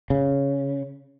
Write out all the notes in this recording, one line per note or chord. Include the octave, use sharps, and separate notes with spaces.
C#3